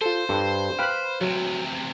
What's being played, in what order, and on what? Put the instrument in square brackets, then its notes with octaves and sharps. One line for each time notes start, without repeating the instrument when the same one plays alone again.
[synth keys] F4 A4 [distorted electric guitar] C5
[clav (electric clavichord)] G2 [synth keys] A4
[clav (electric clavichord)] B4 F5 [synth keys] G5 B5
[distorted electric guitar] D2 C3 [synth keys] F#3